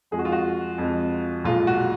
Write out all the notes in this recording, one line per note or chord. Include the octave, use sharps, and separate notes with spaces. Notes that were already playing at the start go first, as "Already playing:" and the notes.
F2 F3 G#3 G#4
F#4
F4
F#4
F2 F3 G#3
B1 A#2 G#3 F4
F#4